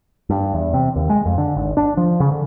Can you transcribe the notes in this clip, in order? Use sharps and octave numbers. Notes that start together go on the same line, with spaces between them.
G2
E2
C3
D#2
G#3
F2
D3
G#1
D4
F3
C#3
D3